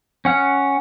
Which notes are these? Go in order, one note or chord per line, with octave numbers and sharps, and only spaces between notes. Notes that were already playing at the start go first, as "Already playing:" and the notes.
C#4 F#5 F6